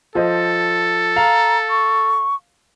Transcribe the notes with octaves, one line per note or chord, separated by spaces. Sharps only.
F3 A4 C5 D#5
F5 A#5
C#6